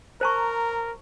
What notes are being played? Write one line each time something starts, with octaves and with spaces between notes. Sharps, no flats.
A#4 C5 A5 A#5 C#6